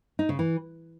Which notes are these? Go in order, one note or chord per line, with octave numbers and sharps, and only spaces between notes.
D#4
C#3
E3